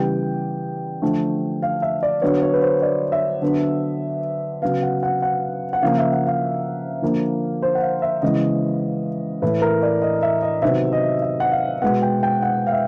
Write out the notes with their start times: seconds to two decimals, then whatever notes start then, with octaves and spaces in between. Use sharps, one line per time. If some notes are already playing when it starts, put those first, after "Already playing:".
Already playing: C#3 E3 G3 B3 G5
1.02 D3 F3 A3
1.62 F5
1.82 E5
2.03 D5
2.22 D3 F#3 B3 C#5
2.43 C#5
2.54 B4
2.62 C5
2.82 D5
3.12 E5
3.42 D3 F#3 B3
4.62 C#3 F#3 B3 F5
4.83 F#5
5.03 F#5
5.22 F#5
5.73 F#5
5.82 C#3 F3 A#3 F5
5.98 E5
6.12 F#5
6.27 F5
7.02 D3 F3 A#3
7.62 C5
7.75 F#5
7.82 F5
8.02 E5
8.22 C#3 E3 G#3 B3 D#5
9.42 A2 E3 A3 B4
9.62 A#4
9.83 D5
10.02 D#5
10.23 E5
10.42 D#5
10.62 C3 D#3 F#3 B3 E5
10.93 D#5
11.22 E5
11.40 F#5
11.52 F5
11.82 B2 G#3 B3 F#5
12.02 G5
12.23 G5
12.42 F#5
12.67 F5
12.72 E5